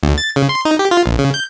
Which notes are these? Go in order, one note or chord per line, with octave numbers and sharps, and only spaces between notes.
D2
A6
C#3
C6
D#4
G4
F4
A#1
C#3
G6